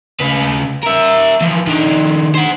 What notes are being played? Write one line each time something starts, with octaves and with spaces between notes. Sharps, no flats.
C#3 B4
A#4 E5
E3 F3
D#3 D4
C5 F#5